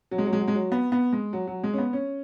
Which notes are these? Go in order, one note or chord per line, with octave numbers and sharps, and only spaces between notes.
F#3
G#3
F#3
G#3
F#3
G#3
F#3
B3
B3
G#3
F#3
F#3
G#3
C#4
B3
C#4